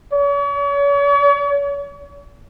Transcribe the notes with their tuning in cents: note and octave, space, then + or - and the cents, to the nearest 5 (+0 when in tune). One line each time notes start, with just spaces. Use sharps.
C#5 +40